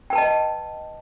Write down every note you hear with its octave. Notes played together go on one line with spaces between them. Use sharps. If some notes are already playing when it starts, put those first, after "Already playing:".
B4 D#5 G5 A5